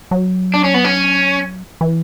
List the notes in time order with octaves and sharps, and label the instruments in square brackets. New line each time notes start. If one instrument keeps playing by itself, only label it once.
[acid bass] F#3
[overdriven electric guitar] D4
C#4
B3
C#4
[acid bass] E3